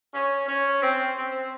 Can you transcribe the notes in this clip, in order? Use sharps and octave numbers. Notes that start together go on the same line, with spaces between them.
C#4
C#4
C4
C4